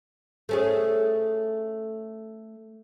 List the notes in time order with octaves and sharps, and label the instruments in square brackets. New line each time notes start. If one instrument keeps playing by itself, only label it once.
[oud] A3 C#4 G#4